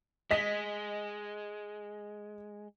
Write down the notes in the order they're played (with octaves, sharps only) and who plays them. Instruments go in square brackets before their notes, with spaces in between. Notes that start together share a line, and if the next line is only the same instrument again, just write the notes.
[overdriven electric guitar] G#3 [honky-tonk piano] D#5 B6